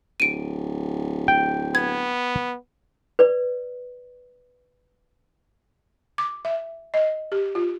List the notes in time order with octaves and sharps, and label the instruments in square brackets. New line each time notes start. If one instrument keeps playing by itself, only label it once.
[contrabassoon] D1 [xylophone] D7 D#7
[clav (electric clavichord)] G5
[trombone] B3 [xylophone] G#6
[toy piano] B4 D5
[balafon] D6
E5
D#5
G4
F4